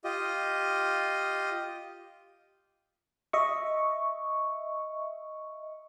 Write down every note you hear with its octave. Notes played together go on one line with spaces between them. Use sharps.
F4 G4 D#5
D#5 E5 C#6